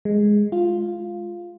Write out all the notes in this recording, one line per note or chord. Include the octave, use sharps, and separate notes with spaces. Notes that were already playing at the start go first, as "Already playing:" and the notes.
G#3
F4